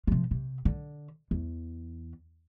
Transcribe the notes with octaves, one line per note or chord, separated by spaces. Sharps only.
C3 F3
C3
D3
E2